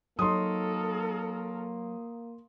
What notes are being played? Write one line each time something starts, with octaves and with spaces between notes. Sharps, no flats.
F#3 A#3 D#4 A4 A#4 C6 D#6